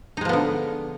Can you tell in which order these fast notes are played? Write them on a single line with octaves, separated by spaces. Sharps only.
D#4 G#3 F3 B3 D3